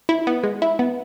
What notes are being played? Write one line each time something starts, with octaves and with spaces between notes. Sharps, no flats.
E4
B3
G#3
E4
B3